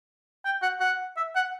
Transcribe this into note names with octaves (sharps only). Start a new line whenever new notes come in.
G5
F#5
F#5
E5
F#5